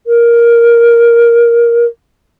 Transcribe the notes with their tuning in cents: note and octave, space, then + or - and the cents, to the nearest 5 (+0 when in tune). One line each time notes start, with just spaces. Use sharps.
A#4 +10